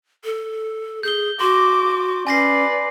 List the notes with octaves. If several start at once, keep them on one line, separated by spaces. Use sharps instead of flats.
A4
G#4 G6 G7
F#4 C6 D6
C#4 B4 D5 G#5 A#6 C7